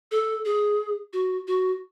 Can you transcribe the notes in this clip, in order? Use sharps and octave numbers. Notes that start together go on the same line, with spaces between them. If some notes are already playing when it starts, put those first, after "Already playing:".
A4
G#4
F#4
F#4